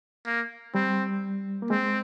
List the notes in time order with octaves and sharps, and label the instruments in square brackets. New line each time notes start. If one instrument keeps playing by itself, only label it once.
[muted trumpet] A#3
[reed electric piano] G3 [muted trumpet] C4
[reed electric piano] A#3
[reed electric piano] G#3 [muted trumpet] C4